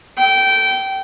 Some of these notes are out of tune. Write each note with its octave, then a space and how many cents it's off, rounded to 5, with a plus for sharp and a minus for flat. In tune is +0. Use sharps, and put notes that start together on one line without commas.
A4 +10 G5 -20